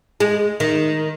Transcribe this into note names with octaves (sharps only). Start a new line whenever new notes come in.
G#3
D#3